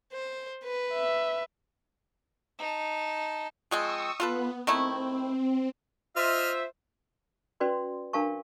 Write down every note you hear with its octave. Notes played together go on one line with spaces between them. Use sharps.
C5
B4
E5
D#4 A5
F3 G#3 C4 C#6 D#6 E6
B3 F4 A4 B4
D#3 A3 C4 E4
F4 C5 D#5 E5 F6
C#4 F#4 B4 D5 C6
D4 A#4 F5 A5 C#6